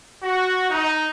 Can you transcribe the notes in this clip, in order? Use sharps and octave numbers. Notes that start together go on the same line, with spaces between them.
F#4
D#4